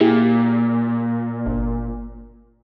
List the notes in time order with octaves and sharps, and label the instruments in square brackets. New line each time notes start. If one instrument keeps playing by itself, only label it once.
[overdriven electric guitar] A#2 [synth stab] E4 G4 G#4
[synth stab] G1